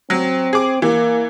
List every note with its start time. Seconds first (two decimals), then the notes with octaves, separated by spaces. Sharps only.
0.10 F#3 C4
0.53 G#4 D6
0.82 E3 A#3